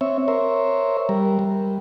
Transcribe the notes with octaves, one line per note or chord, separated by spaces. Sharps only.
C4 C#5 E5
A#4 C5 C#5 E5
G3 A#4
G3